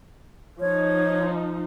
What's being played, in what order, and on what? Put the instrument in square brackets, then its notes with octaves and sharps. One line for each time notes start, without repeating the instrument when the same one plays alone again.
[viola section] F3 D#4 [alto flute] C#5